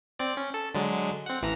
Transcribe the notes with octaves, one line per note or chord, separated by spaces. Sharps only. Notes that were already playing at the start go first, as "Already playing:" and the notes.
C4 D5
C#4
A4
D3 F#3 G#3
C4 F#5
A1 E3 A#5